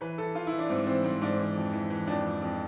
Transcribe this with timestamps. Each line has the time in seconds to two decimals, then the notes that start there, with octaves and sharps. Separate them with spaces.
0.01 E3 B4
0.18 E3 A4
0.35 E3 F4
0.47 E4
0.52 E3
0.58 D4
0.70 G#2 C4
0.87 E3 C4
1.04 G#2 C4
1.21 G#2 D4
1.38 E3
1.56 F2
1.73 E3
1.90 E3
2.07 F2 D4
2.24 F2
2.41 F2